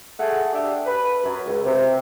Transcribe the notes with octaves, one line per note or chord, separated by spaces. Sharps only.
A3 G#4 F#5
D4 G4 E5
B4
F#2
C#2
C3